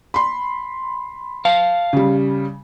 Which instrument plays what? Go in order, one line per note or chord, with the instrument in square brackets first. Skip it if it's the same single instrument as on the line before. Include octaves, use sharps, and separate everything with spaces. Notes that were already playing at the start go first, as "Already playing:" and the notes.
[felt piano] B5 C6
[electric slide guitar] F5 A5
[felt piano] C#3 G3